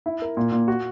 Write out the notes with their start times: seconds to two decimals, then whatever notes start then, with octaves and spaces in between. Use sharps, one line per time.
0.06 E4
0.22 A#4
0.37 A#2
0.52 A#2
0.68 F#4